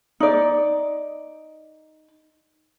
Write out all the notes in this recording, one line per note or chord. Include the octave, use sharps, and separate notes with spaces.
D#4 D5